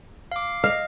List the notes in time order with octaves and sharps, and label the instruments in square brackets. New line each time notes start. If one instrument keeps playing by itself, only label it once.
[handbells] F5 D6
[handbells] D#5 [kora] F5